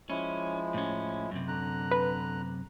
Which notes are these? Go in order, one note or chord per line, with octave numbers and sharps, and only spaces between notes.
F3 G#3 C#4 E4
A2 C#4
F#2 C3
D3 A#5 F#6
B4